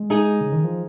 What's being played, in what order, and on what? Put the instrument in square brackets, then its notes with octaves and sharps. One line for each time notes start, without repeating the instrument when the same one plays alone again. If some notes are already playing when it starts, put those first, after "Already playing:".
Already playing: [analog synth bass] G#3
[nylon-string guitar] D#4 G#4
[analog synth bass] C#3
D#3
F3